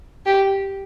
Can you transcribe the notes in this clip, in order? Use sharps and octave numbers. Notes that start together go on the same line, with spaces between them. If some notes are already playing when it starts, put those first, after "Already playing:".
G4